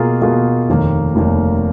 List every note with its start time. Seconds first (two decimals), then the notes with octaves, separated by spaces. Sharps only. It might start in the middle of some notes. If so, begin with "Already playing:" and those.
Already playing: B2 A#3 F4 G#4
0.22 B2 A#3 F4 G#4
0.69 F1 D#2 D#3 A#3
1.15 F1 D#2 D#3 A#3